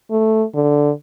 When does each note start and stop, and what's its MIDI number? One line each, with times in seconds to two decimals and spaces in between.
0.11 0.44 57
0.55 0.91 50